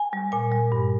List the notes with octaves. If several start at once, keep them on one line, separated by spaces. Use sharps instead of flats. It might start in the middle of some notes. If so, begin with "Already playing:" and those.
Already playing: G#5
G3
A#2 G#5
G3
G2